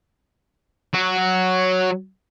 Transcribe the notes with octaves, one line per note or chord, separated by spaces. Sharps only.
F#3 F#4